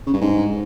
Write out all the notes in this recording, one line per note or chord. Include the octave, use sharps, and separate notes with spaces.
C#3
G2
G#2